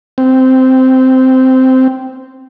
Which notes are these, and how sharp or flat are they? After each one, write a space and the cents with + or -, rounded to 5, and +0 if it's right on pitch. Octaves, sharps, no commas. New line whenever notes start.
C4 -10